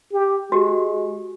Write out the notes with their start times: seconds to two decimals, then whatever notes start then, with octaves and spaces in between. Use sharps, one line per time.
0.12 G4
0.52 G#3 F#4 G4